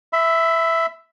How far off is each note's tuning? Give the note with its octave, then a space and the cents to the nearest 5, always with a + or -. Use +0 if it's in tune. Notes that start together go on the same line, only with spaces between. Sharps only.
E5 +0 B5 +35